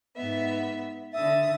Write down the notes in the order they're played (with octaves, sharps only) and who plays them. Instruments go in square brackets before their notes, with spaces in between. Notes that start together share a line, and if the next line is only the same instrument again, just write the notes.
[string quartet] G#2 B3 E5
[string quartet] D3 D#6 A6 [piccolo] E5